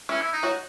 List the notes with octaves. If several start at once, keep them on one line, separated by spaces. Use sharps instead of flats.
E3 C#4 E4
E4
D#4
F#3 F#4